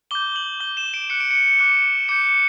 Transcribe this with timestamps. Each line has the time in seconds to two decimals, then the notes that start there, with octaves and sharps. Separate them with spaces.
0.11 D6 G6 G7
0.36 F#7
0.60 D6 G6 G7
0.77 E7
0.94 D7
1.10 D6 F#6 C#7
1.20 D7
1.31 C#7
1.59 D6 F#6
2.09 D6 G6 C#7